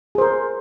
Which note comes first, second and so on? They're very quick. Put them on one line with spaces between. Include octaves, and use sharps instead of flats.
G#4 C5 A#4